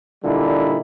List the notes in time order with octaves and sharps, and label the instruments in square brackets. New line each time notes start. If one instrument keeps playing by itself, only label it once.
[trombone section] A#2 D3 G3 D#4 E4